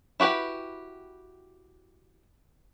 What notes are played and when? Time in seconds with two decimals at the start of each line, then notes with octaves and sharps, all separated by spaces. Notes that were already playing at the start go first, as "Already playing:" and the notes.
0.20 E4 F#4 G4 B4 G5